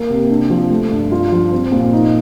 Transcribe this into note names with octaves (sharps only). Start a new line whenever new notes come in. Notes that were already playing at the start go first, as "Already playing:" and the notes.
Already playing: A#3
C3
D4
F3
A3
G2
F4
F3
C4
A#2
D#4